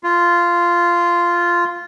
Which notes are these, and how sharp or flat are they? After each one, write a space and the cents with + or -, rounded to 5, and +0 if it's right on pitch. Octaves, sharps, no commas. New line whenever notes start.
F4 -10